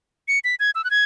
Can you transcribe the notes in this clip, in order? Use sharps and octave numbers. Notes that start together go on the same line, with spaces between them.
C#7
B6
G#6
E6
F#6
G#6